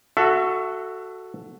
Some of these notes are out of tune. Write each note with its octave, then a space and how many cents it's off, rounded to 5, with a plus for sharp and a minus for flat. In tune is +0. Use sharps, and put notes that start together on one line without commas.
F#4 +0 A4 +0 E5 +30